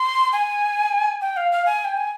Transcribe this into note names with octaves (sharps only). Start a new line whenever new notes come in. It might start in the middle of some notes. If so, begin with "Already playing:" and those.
Already playing: C6
G#5
G5
F5
F5
G#5
G5
G#5